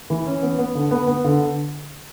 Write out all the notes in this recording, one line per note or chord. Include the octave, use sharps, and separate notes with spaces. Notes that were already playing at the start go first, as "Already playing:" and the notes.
E3
C#4
B3
B3
D3
B3
B3
D3